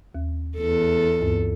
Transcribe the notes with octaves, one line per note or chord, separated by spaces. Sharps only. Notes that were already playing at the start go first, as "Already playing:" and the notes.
D#2
E2 A4
D2 G2 B3